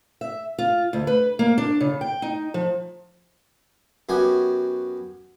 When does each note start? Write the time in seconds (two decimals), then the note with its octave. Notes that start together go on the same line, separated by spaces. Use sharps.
0.21 E5
0.58 F4
0.93 D2
1.07 B4
1.39 A#3
1.58 D4
1.80 C#3
2.01 G5
2.22 D#4
2.54 F3
4.09 F#2 B3 F#4 G4 G#5